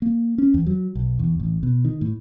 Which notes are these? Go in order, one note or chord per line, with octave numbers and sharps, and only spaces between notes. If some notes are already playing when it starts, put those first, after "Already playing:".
A#3
C#4
E2
F#3
B1
E2
A1
B2
D#3
A2